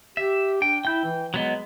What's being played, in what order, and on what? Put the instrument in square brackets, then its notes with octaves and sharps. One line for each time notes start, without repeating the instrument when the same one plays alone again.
[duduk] G4 [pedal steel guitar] E5
[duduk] D4 [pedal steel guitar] G5
[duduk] E4 [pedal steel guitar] G5 G6
[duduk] E3
[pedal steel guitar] F#3 B3 D#5 [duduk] G#3